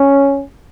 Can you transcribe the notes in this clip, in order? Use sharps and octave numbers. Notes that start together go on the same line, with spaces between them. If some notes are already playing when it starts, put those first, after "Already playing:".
Already playing: C#4